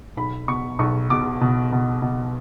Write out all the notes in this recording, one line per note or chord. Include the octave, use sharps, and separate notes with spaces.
B1 B5
B2 C#6
B1 C#6
B2 D6
B2
B2
B2